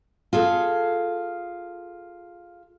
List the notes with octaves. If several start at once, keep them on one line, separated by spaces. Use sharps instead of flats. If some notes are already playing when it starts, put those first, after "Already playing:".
F4 G#4 A4